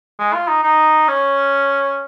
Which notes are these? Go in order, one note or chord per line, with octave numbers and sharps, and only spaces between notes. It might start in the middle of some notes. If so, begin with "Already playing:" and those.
G#3
F4
D#4
D#4
C#4